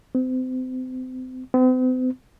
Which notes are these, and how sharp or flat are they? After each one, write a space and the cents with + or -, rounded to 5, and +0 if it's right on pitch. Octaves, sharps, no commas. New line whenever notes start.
C4 -35
C4 -45